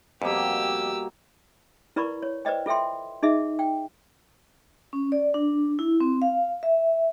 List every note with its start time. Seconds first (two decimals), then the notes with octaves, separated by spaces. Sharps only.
0.22 F2 B2 G3 A#3 G4 E6
1.96 E4 A#4 B4 D5 B5 C#6
2.22 C#5
2.45 B4 C5 D5 D#5 G5
2.66 F4 A4 E5 G5 C6
3.23 D#4 G#4 D#5 E5
3.59 G5
4.93 C#4
5.12 D5
5.34 D4
5.79 E4
6.01 C4
6.22 F5
6.63 E5